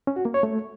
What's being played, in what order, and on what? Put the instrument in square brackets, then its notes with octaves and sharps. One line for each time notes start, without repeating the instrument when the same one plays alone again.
[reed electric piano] C#4
F#4
A#3
C#5
A3